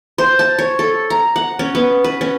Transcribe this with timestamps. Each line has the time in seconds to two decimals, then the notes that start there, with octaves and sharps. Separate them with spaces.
0.18 C5
0.39 A5
0.59 C#5
0.79 A4
1.10 A#5
1.36 F#5
1.59 C#4
1.75 B3
2.04 B4
2.21 C#4